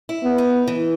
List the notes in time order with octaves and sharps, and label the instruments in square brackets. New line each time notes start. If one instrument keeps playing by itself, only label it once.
[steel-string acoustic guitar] E4
[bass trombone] B3
[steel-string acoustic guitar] D#4
E3